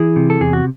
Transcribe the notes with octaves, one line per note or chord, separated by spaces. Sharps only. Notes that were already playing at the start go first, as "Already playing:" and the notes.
Already playing: E3 E4 G#4
C3
A4
E2 G#4
F#4